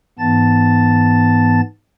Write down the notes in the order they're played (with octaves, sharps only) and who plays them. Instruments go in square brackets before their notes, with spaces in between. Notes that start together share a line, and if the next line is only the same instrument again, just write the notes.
[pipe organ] G#2 E3 B3 A5 A6